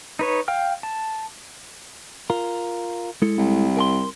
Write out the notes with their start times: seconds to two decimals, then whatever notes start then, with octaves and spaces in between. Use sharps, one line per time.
0.19 D#4 B4 C#5
0.48 F5 G5 F6
0.83 A5
2.30 F4 A#4
3.22 G#3 E4 A4
3.37 C2
3.77 A#4 G#5 C6